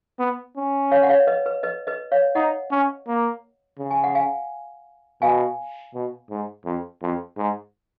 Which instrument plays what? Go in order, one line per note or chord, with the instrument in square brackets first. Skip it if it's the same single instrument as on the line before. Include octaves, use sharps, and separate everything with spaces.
[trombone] B3
C#4
[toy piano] C#5 F5
F#5
C#5 F5
B4 D#5
B4
B4 D#5
B4 D#5
C#5 F5
[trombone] D#4 [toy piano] D#5 F#5
[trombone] C#4
A#3
C#3
[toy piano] G#5
F#5
F5 G#5
[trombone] B2 [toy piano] F5 G#5
[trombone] B2
G#2
F2
F2
G#2